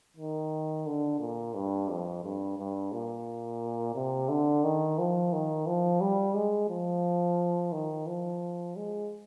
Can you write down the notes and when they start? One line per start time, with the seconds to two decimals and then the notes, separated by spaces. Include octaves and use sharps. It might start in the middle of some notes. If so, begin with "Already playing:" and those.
0.17 D#3
0.87 D3
1.20 A#2
1.55 G2
1.89 F2
2.23 G2
2.58 G2
2.92 A#2
3.95 C3
4.29 D3
4.64 D#3
4.98 F3
5.33 D#3
5.67 F3
6.01 G3
6.35 G#3
6.69 F3
7.72 D#3
8.07 F3
8.76 G#3